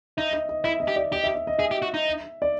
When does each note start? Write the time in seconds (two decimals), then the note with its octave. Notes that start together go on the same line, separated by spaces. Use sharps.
0.17 D#4 E5
0.33 D#5
0.49 D#5
0.64 E4 E5
0.80 D#5
0.88 G4
0.96 D5
1.11 G4 D#5
1.24 E5
1.35 E5
1.47 D#5
1.59 G#4 E5
1.71 G4
1.82 F#4
1.94 D#4
2.42 D5